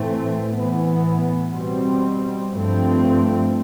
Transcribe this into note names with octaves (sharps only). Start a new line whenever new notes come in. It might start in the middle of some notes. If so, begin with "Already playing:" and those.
Already playing: A2 E3 A3 C4
A2 E3 B3
B2 G3 C4
G2 F3 A3 C4